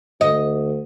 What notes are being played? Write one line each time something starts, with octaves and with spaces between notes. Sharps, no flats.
D2 D#5